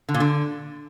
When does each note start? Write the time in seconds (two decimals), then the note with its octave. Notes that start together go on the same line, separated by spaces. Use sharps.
0.09 D3
0.14 A#2
0.20 D3